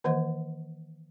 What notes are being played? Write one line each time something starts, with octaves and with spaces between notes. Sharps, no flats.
D#3 E3 A#3 C5 D#5 F#5